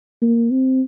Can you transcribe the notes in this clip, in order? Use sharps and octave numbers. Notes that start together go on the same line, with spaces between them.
A#3
C4